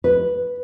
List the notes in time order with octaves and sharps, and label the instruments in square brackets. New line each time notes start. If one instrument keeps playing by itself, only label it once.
[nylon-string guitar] B4